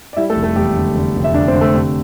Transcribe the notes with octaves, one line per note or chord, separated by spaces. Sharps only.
D5
G3 E4 E5
A3 A4
F1
A3 A4
E2 G3 G4
D3
D3
F1
E5
D3 D4 D5
C4 C5
D3
A3 A4
C3